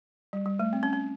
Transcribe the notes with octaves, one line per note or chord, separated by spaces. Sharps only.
G3
G3
A3
C4
C#4
C#4